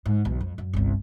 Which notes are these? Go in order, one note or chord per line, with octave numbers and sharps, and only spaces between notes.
G#2
B1 E2
F2
F#2
G1 C2